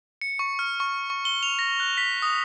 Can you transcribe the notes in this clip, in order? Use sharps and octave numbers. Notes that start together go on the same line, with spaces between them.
C#7
C#6
F6
C#6
C#6
G7
F7
A#6
F#6
B6
D#6